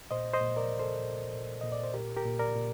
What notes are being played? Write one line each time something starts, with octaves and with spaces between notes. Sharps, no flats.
A#2 C5 D#5
C5 D#5
A#2
A#4 D5
A#2
A4 C5
A#2
A#2
A#2 D#5
D5
C5
A#2 G4 A#4
G4 A#4
A#2
A#4 D5
A#2